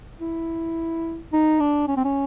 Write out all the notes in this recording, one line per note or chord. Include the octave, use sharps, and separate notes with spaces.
E4
D#4
D4
C#4
C4
C#4